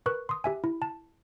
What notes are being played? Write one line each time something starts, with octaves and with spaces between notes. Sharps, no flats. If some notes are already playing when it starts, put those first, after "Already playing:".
A#4 B4 C#6 F#6
C6 D#6
G4 E5 G#5
E4
A5